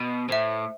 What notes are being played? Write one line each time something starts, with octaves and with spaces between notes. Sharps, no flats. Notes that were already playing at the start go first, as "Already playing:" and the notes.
Already playing: B2
A2 C5 E5